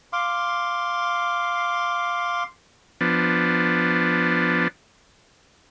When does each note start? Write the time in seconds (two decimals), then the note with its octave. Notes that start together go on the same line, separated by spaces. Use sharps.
0.13 F5 C6 D6
3.01 F3 B3 D4